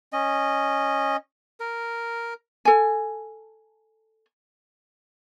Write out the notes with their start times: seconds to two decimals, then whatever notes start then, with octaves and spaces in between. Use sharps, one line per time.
0.13 C#4 D#5
1.60 A#4
2.65 A4 G#5